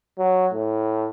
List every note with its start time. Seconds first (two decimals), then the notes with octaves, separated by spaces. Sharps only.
0.19 F#3
0.54 A2